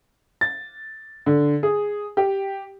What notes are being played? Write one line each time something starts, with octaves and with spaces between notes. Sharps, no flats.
A6
D3
G#4
G4